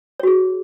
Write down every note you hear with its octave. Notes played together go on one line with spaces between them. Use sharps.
F#4 G#4 C#5